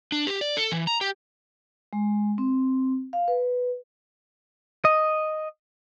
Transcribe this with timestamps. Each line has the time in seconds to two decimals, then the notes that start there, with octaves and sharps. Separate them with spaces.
0.12 D4
0.27 G4
0.41 D5
0.57 A4
0.72 E3
0.87 A#5
1.01 G4
1.93 G#3
2.38 C4
3.13 F5
3.28 B4
4.85 D#5